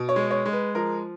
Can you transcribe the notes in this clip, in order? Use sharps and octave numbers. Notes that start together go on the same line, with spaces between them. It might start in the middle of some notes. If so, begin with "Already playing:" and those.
Already playing: B2
C#5
G#3
C#5
G#3
B4
F3 A#4